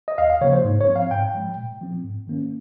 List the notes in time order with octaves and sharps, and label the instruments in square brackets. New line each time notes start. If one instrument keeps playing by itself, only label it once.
[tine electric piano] D#5
D#2 F5
F5
C#3 F3 A#3 C#5
C5
G#2
C#5
F3 C4
F5
G#2 G5
F3 G#3
A#2
F3 C4
G#2
D#3 A#3 C#4